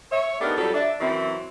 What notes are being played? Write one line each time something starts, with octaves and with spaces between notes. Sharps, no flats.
C#5 E5
A3 B3 D4 D#4 G4 A#4
F2 F#3 G3 A4
D4 E5
F#2 E3 F#3 C4 E4